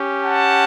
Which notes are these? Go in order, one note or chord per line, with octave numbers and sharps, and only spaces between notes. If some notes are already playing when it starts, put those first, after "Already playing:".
Already playing: C#4 G4
F#5 A5